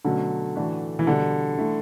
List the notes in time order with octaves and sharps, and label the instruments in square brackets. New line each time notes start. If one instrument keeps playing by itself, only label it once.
[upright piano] B2 F#3 A3 C#4 [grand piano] D3
[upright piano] A2 E3 A3 D4 F#4
[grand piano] E3
[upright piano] B2 G3 D4 [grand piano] D3
[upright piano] D3 A3 E4